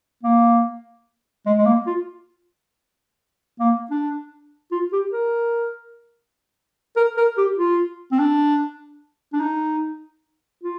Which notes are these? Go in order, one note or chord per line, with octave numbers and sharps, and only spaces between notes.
A#3
G#3
G#3
A#3
F4
A#3
D4
F4
G4
A#4
A#4
A#4
G4
F4
C4
D4
D4
D#4
F4